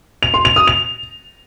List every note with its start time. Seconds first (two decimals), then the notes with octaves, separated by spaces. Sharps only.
0.23 F7
0.34 C6
0.45 F7
0.56 D#6
0.67 F7